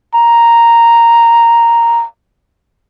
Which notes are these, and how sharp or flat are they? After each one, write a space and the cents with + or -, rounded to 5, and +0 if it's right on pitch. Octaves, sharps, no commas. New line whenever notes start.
A#5 -5